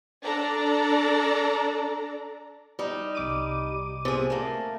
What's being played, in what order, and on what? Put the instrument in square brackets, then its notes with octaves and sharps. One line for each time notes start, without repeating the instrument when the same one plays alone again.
[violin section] D4 A4 D5 A#5
[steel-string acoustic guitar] G3 D#4
[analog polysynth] C2 D6 D#7
[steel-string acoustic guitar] C3 G#4
A3 A#3